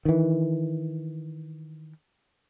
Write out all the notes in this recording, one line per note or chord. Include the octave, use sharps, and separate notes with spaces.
D#3 E3